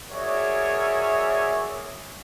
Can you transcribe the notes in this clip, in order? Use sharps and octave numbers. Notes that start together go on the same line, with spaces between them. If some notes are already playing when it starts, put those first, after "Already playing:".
F#4 G#4 A#4 C#5 D5 E5